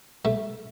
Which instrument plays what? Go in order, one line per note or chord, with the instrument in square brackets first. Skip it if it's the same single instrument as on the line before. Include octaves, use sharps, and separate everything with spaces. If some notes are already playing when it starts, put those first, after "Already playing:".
[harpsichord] A3